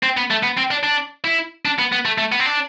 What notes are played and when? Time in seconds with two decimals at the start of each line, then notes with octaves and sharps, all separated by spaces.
0.03 C4
0.17 B3
0.30 A3
0.43 B3
0.57 C4
0.71 D4
0.83 D4
1.25 E4
1.65 D4
1.79 B3
1.92 B3
2.05 A3
2.18 A3
2.32 B3
2.40 C4
2.46 D4